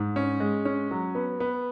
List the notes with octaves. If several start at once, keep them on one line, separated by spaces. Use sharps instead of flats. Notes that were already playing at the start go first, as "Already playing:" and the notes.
Already playing: G#2
C#4
G#3
C#4
F#3
B3
B3